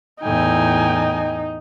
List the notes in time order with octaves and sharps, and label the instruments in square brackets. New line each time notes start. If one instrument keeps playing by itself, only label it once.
[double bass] E2 A2 [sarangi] D#4 [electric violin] G5 G#5